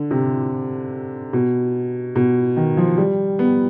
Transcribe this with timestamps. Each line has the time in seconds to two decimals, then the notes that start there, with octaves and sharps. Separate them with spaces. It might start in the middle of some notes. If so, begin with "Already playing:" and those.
Already playing: D3
0.11 C3
1.33 B2
2.16 B2
2.57 D#3
2.77 F3
2.98 G3
3.39 B3